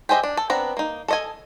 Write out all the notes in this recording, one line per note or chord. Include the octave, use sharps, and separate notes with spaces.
G4 G#4 C5 D#5 E5
D4
A4
B3 C4 D4 A#5
A#3 D#4
A4 D#5 G#5